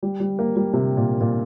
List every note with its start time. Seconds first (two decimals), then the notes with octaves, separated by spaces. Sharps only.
0.03 G3
0.20 G3
0.39 A#3
0.56 G3
0.73 C3
0.97 A#2
1.21 A#2